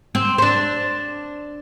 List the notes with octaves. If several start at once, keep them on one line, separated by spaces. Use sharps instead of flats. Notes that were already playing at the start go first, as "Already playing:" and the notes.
C4
D4 C5